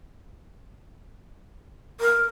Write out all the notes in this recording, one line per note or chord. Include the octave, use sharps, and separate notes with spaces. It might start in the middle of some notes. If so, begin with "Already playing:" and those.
A#4